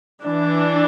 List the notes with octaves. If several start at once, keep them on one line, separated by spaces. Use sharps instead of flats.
E3 D4